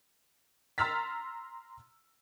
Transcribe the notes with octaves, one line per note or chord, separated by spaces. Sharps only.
A#5 C6 E6 F6 A6 B6